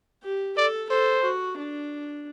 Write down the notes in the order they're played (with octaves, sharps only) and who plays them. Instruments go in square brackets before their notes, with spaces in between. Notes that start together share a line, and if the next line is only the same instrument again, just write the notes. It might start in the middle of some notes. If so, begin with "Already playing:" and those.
[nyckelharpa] G4
[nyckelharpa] A4 [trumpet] D5
[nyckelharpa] A4 [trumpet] C5
[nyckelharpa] F#4
D4